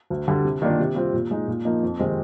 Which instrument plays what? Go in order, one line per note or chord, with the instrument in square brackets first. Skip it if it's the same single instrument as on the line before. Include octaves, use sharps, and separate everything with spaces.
[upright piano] D2
D3 G3
C3
D#3 A#3 D4 F4
C3
G3 C4 F4
A#2
G#3 D#4
A#2
F3 A#3 D#4
F2
C3 D#3 G#3 C4